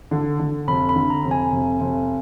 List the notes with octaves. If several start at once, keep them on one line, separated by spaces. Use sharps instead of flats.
D3
D3
F1 B5
B5
D3
A#5
F1
G#5
F1
F1